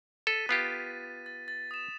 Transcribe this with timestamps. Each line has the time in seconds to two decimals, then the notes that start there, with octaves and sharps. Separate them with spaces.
0.27 A4 A6 B6 D#7
0.49 B3 F4 G4
1.26 A6
1.48 A6
1.71 D#6 E7